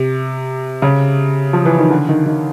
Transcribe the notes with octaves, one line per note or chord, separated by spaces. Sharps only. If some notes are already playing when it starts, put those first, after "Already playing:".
Already playing: C3
C#3
F3
E3
D#3
D3
D#3
D#3